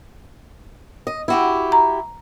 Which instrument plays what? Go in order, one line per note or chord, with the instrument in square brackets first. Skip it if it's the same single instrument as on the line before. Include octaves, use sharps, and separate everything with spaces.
[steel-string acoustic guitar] D#5
E4 F#4 G4
[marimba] A#5